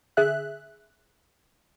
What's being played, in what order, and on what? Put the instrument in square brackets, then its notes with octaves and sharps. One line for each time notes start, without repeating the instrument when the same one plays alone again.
[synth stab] D3 G#4 E5 F#6